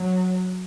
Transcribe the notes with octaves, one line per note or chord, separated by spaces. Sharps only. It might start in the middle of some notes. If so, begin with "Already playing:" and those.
Already playing: F#3